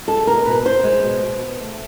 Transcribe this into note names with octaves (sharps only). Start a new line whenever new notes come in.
G#3 A4
B2 A#4
B2 B4
B3 C5
G#3
B2
B2
B3
A3